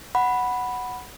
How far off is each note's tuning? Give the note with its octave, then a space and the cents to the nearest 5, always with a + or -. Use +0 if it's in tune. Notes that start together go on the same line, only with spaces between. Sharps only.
F#5 +0 B5 +0